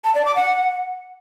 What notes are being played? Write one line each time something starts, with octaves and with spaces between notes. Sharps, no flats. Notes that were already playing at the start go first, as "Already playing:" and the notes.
A5
D5
D6
F#5